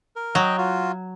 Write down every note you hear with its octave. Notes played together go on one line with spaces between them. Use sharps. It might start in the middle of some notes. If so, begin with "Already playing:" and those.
A#4
F#3 D#5 G5
F4 F#4